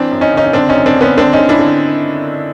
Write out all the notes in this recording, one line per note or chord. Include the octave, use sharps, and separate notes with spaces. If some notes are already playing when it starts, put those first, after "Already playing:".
Already playing: E3 C4 D4
F#2
C#4 D#4
C#3 C#4 D#4
D#4
D3 C4 D4
C#4 D#4
F#2
C4 D4
D3
B3 C#4
D3 C4 D4
C#4 D#4
D3
D4 E4
D3